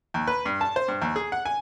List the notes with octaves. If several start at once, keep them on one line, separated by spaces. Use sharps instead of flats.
D#2
B4
G2
A5
C5
G2
D#2
G#4
F#5
G#5